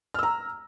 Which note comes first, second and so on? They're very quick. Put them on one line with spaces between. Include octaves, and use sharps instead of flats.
F6 E6 A#5